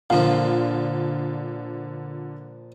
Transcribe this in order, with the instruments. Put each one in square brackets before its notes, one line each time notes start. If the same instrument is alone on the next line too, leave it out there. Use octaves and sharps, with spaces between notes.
[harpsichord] A#2 F3 [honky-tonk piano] D3 F4